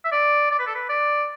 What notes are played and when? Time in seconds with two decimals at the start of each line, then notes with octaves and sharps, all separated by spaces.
0.05 E5
0.12 D5
0.51 D5
0.59 B4
0.67 A4
0.75 B4
0.89 D5